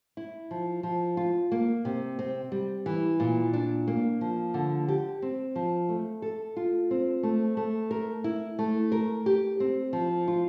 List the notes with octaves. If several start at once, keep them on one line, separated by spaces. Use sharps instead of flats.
E4
F3
F3
F4
A#3
C3
C4
G3
E3
A#2
D4
A#3
F3
D3
G4
C4
F3
A3
A4
F4
C4
A3
A3
A#4
E4
A3
A#4
G4
C4
F3
F4